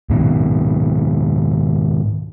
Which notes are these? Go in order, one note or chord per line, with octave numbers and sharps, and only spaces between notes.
G#2 B2 D#3